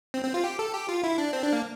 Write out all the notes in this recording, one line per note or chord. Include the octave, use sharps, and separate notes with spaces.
C4
C4
F4
G4
A4
G4
F4
E4
D4
C4
D4
A#3